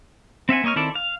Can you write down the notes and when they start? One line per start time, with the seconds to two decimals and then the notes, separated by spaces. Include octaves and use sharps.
0.49 C4 E5 F#5 G#5
0.64 A#3 C#5 D#5 C#6 F6
0.76 D#3 C4 E4 A4 D5
0.95 F5